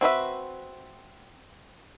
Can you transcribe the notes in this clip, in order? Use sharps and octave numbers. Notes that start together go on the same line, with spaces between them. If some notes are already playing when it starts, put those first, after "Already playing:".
C4 F#4 B4 E5